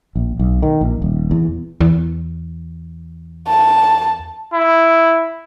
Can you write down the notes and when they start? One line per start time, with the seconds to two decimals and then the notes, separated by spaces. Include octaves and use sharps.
0.16 A#1
0.39 B1
0.62 D#3
0.81 A#1
1.02 D#1
1.31 E2
1.81 E2
3.48 A5
4.54 E4